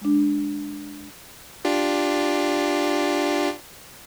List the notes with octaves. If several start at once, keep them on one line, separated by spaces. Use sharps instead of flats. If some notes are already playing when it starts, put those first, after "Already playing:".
G#3 D4
D4 F4 G4